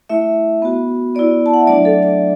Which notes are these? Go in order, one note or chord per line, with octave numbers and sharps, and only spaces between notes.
A3 E4 E5
B3 F#4
B3 E4 D5
A5
F#5
E5
F#3 A3 D4 D5
A4
D5